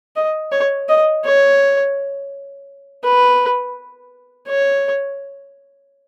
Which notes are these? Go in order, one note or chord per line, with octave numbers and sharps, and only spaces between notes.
D#5
C#5
D#5
C#5
B4
C#5